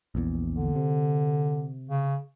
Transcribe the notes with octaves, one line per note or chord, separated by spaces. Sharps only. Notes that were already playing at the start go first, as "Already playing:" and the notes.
A#1 E2
D3
C3
C#3